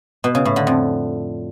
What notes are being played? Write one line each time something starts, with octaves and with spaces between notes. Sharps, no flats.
B2
C#3
A2
D3
F2